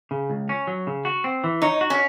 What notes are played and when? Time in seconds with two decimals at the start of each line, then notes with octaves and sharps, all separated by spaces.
0.11 C#3
0.30 C#2
0.49 C#4
0.67 F#3
0.87 C#3
1.05 F#4
1.24 C4
1.44 E3
1.62 D#4 C#5
1.81 F#4
1.90 C#4